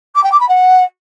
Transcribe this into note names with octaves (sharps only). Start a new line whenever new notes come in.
D6
G5
D6
B5
F#5